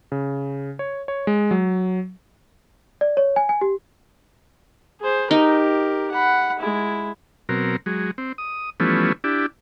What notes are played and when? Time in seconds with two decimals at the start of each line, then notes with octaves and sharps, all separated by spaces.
0.12 C#3
0.79 C#5
1.08 C#5
1.27 G#3
1.51 F#3
3.01 D5
3.17 C#5
3.36 G#5
3.49 G#5
3.61 G4
5.00 G#4 C5
5.31 D#4 G4 A#4
6.11 F#5 B5
6.59 G#3 E4
7.49 B2 F#3 C4 A#4
7.86 F#3 G#3
8.18 C4
8.38 D#6
8.80 E3 F3 G3 A3 B3 C#4
9.24 D4 E4 G4